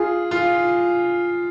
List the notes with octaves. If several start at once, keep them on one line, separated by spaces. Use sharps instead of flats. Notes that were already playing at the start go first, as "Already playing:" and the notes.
Already playing: F4 G#4
F4